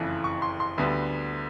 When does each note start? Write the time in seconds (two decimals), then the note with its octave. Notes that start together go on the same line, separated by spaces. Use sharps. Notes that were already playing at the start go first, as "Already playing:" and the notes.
Already playing: F#1 F2 C#3 E3 A3
0.24 C#6
0.42 C6
0.60 C6
0.78 D2 D3 G3 B3